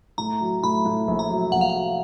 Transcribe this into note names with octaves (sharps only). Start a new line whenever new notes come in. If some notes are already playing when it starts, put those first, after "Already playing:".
A2 A#5
F#3
A2 B5
A2
A#1
A#5
F#3
A#1 F#5
F5
F#5
F#3